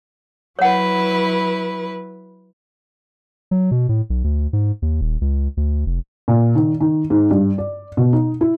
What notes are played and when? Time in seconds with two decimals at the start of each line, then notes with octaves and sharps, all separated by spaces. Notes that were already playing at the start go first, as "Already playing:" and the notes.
0.59 F#3 E4 B4 C#5 F#5
3.51 F#3
3.71 B2
3.89 A2
4.10 B1
4.24 D2
4.53 G#2
4.82 D#2
5.01 D#1
5.21 C#2
5.57 D2
5.86 F1
6.28 A#2
6.55 D#3
6.80 D#3
7.10 G#2
7.31 G2
7.58 D5
7.97 B2
8.13 D#4
8.41 E4